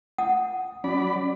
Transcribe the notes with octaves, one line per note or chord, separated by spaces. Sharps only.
F#5 D#6
F#3 C#4 D5 B5